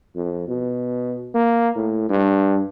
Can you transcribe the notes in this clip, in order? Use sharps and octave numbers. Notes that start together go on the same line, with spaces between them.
F2
B2
A#3
A2
G2